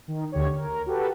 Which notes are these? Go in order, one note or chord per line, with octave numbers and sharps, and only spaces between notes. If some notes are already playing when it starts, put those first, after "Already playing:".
D#3
D2 D3 G4 C#5
A#4
F#4 G4 A4 B4